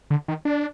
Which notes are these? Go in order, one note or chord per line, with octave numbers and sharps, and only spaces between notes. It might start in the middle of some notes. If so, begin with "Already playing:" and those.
D3
D#3
D4